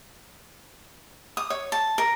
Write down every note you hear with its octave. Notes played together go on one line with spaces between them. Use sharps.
D#6
C#5
A5
A#4